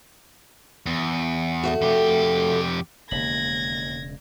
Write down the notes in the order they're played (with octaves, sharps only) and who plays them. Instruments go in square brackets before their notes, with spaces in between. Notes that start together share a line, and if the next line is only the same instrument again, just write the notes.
[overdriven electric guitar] E2
[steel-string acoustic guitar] D2 A3 F#4
[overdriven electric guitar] F2 G4
[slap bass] E1 C#3 G#3 [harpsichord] D#2 B5 [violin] G#6 A#6